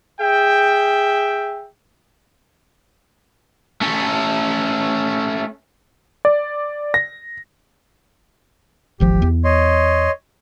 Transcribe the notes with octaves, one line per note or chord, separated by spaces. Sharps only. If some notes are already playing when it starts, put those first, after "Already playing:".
G#4 E5 G5
A3 C#4
D5
A#6
D1 G#1 F3 G4
E2
C#5 D#5 C6